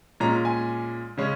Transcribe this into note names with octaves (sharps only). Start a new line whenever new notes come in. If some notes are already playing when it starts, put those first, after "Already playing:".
A#2 G#3 C#4 A#5
G#5
C#3 G#3 C#4